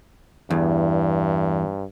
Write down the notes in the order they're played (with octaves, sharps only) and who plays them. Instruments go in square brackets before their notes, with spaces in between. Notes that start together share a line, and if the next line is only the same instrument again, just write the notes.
[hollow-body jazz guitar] E2 [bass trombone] G2